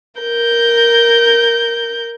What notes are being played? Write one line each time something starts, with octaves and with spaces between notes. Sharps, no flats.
A#4 G6